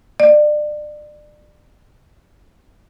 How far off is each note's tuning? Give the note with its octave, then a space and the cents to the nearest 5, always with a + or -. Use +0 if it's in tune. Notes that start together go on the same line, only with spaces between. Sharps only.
D5 +30